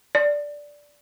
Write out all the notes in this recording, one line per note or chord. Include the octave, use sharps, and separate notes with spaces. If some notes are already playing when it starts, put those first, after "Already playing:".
D5